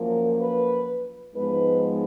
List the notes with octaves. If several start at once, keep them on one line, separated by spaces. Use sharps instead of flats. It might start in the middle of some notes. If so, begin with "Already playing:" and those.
Already playing: F#2 F3 A#3 A#4
B4
G#2 F3 G#3 B3 D#4 B4